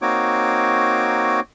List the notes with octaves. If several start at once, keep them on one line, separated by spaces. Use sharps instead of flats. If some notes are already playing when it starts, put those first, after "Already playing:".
A#3 C4 D#4 F#4 C#5 D6